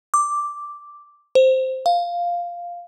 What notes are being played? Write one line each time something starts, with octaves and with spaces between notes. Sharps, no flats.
D6
C5
F5